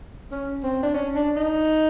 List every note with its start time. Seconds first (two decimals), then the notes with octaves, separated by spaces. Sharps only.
0.31 C#4
0.63 C4
0.83 D4
0.94 C#4
1.15 D4
1.36 D#4